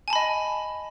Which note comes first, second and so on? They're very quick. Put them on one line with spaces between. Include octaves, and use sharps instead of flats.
G#5 A5 B5 D#5